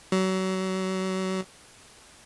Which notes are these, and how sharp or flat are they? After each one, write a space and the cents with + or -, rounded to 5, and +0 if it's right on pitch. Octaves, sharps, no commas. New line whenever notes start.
F#3 +30